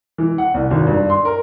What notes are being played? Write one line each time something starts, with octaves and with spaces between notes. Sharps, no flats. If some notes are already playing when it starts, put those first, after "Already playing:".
E3
F#5
C2
G#1
G2
C6
A#4